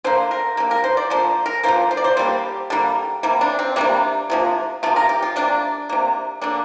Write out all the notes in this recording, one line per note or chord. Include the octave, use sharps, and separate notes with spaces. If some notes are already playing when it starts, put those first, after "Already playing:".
D3 A#3 C5
A#4
D3 A#3 G4
A#4
C5
D5
D3 F3 A#3 C5
A#4
D3 F3 A#3 C5
C5
D5
C5
D3 G3 A#3 G4
D3 G3 A#3
C3 G3 A#3
D4
C4
C3 G3 A#3 D4
C3 F3 A#3
C3 F3 A#3 F4
A#4
G4
F4
C3 A#3 D4
C3 A#3
D3 A#3 D4